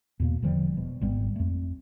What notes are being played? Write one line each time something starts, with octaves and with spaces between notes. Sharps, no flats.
E2 B2 A#3
E1 D3 F3 G3
B2
G#1 G3 B3
F2 A3